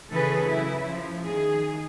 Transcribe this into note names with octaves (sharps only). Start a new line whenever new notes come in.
C#3 E3 C#4 G#4 A4 B4
C#3 F#3 E4
F3
D#3 G#4